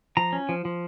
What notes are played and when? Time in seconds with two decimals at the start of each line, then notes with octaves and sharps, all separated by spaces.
0.17 F3 A#5
0.33 C#4
0.49 F3
0.65 F3